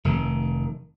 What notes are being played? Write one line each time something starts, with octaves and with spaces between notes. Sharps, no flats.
F1 D#3